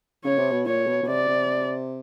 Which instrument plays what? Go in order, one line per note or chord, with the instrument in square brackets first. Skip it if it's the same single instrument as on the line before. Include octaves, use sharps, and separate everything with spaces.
[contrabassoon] C#3 [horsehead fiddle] C#5
[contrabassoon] C3
B2
[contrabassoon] A#2 [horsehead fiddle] C#5
[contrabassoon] B2
B2
[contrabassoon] C3 [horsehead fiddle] D5
[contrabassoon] C3